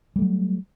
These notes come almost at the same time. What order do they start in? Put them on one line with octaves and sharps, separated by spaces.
G3 A3 F#3